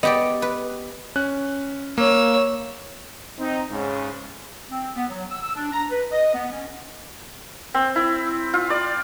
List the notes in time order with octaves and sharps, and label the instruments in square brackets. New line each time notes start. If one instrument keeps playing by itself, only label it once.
[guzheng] B3 G4 D5 [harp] D#5
[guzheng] B4
[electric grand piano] C#4 F#6
[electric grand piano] A#3 [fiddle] C#5 E6
[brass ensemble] C4 D#4
G#2 C#3
[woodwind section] C4
B3
F#3
E6
D4
A#5
B4
D#5
B3
C#4
[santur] C4
E4
F4
D5